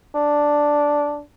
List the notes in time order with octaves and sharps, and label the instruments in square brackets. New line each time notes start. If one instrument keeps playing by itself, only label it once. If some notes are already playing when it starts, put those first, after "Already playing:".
[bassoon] D4